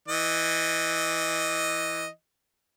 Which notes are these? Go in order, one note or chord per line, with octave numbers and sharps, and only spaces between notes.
E3 D#5